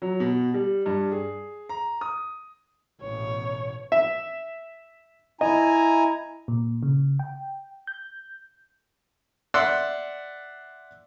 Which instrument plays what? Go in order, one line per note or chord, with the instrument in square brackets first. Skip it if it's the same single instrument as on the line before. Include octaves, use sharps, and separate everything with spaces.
[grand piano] F#3
B2
G3
G2
G#4
A#5
D#6
[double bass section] A1 B2 [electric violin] C#5
[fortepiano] E5
[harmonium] E4 G#5 A#5 [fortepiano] D#5
[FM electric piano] A#2
C#3
G5
G6
[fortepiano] D5 E5 F#5 C6 E6